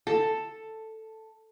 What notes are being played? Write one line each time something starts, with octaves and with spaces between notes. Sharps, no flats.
A4